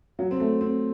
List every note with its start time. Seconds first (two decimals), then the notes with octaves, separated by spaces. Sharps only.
0.19 F#3
0.31 C4
0.40 A3
0.61 C4